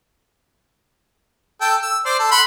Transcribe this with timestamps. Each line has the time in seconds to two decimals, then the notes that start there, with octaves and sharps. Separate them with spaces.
1.61 A4 G5
1.82 E6
2.06 C5 D5
2.19 A4
2.31 F#5 B5 C6